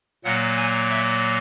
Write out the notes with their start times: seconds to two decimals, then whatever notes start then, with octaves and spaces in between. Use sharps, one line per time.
0.24 A#2 F#3 A#3 F#5
0.57 G#5
0.90 E5